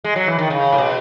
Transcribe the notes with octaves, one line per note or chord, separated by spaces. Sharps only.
G#3
F#3
E3
D#3
C#3
A2
B2